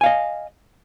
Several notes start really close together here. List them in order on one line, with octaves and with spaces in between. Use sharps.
G#5 F5 D#5